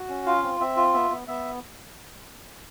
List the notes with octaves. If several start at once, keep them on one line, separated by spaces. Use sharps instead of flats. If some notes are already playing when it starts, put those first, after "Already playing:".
Already playing: F#4
C#4
F4 F5
C4
C4 E5
F4
B3 E5
B3
B3 E5